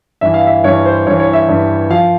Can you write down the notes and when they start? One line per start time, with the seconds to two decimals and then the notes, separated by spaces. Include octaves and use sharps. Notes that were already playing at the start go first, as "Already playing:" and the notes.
0.21 G2 E3 E5
0.34 F5
0.47 E5
0.64 G2 E3 C#5
0.85 C5
1.06 G2 E3 C#5
1.20 C#5
1.33 E5
1.48 G2 E3
1.90 F3 F5